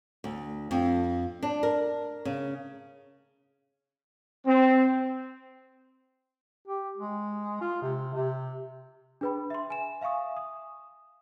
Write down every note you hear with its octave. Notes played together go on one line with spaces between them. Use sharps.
D2
F2
D4
A#4
C#3
C4
G4
G#3
F4
C3
C3
D4 G#4 B4 G5 B5
E5 C6
G#5 E7
E5 F5 G#5 C#6 D#6
D#6